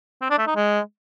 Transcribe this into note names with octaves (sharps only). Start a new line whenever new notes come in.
C4
D4
A3
D#4
G#3